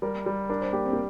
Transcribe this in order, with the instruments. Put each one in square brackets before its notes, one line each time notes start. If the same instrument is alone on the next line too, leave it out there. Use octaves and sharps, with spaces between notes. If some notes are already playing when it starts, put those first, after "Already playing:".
[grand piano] G3 [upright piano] A#4
[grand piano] G3
[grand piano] D4 [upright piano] A#4
[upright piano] C5
[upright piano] A#3 [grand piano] G4
[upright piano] C4
A#3